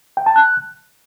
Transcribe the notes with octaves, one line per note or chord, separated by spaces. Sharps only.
G5
A5
F#6